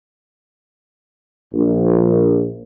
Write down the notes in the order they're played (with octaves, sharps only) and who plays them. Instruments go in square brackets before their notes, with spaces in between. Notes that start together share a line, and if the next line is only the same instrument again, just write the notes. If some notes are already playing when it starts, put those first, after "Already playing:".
[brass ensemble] A#1